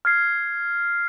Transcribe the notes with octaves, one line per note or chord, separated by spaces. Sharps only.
F6 G#6 C7